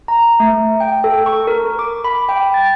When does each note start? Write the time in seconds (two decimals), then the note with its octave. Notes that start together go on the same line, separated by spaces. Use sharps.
0.08 A#5
0.40 A3
0.80 G5
1.04 A4
1.26 C#6
1.47 A#4
1.79 D6
2.05 B5
2.29 G5
2.54 A6